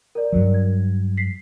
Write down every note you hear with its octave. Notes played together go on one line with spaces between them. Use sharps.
A#4 D5
G2 F#3
G#6
B6 C7